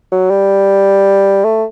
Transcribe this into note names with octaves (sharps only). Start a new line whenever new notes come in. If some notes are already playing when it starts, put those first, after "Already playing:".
F#3
G3
A3